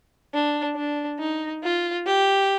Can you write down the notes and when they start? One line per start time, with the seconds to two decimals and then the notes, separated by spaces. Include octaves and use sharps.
0.34 D4
0.76 D4
1.19 D#4
1.63 F4
2.06 G4